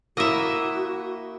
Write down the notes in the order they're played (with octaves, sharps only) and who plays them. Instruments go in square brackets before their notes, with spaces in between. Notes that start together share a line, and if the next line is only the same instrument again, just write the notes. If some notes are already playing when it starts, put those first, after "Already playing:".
[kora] A#3 E4 [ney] F#4 [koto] D#5 E5